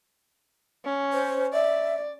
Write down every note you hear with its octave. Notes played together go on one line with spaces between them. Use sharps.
C#4
C5
D5 E5